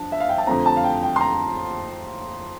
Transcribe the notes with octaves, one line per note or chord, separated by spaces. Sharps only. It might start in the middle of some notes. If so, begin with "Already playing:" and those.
Already playing: F2 D4 A5
E5
F5
G5
A5
F2 D3 A3 C4 A#5
A5
F5
G5
G5
C6
A#5